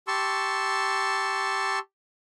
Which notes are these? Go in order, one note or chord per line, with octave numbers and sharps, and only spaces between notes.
G4 A5 C6 C#6 E6